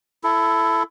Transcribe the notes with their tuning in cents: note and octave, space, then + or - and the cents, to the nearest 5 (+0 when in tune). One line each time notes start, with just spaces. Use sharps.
E4 +20 A4 +0